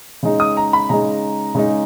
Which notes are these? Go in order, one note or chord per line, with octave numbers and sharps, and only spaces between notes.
C#3 G#3 D#4
D#6
A#5
B5
C#3 G#3 D#4 A#5
C#3 G#3 D#4